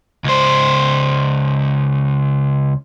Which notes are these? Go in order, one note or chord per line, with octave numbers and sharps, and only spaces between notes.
C#2 C5